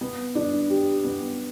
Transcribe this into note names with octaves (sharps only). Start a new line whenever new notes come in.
B3
D4
G4
B3